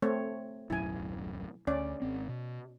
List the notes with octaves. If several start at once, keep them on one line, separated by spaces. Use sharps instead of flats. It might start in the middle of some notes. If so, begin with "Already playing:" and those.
A3 C4 C#5
D1 B1 F#2 E4 G#5
D2 C#4 D5
G#1 C4
B2